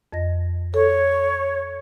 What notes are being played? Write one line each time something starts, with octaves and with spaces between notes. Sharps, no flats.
F2 D#5 A#6
A4 C#5